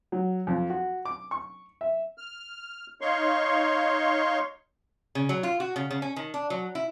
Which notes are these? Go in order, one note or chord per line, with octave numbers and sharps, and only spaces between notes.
F#3
F2
F#4
D6
C#6
E5
F6
D#4 C#5 F5 C6 C#6
C#3
F#3
F4
F#4
C#3
C#3
C#4
D#3
D4
F#3
E4